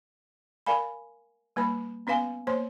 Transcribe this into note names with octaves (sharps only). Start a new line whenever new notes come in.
A#4 D5 F5 G#5 B5
G3 A#3 B4 B5
B3 C#4 B4 F5 G#5
A#3 C5 C#5 C6